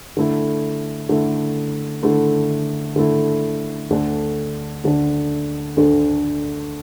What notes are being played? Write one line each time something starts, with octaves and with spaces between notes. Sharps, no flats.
D3 A3 E4
D3 A3 E4
D3 A3 E4
D3 A3 E4
D2 D3 A3 D4
D2 D3 A3 D4
D2 D3 A3 D4